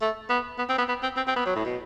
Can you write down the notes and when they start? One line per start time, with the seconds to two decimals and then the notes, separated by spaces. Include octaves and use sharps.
0.01 A3
0.30 B3
0.58 B3
0.69 C4
0.78 B3
0.88 B3
1.03 C4
1.17 C4
1.27 C4
1.36 B3
1.46 F#3
1.56 A2
1.65 B2